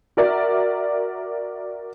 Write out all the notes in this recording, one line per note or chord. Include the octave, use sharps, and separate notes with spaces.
F#4 A#4 D5 E5